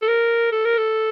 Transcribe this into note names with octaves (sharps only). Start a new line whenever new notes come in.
A4
A#4
A4
A#4
A4